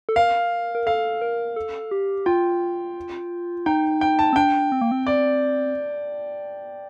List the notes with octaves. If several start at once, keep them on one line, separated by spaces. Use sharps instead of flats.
A4
A#4 F5
A#4
A4 F5
A#4
A4
G4
F4 G5
D#4 G5
G5
A5
C4
D4 G5
C4
A#3
C4
D5